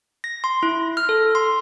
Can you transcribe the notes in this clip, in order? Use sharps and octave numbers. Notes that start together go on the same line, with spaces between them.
A#6
C6
E4
F6
A4
C6